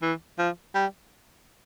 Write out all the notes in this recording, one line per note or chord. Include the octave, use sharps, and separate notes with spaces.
E3
F3
G3